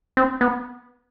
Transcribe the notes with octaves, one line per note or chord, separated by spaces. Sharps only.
C4
B3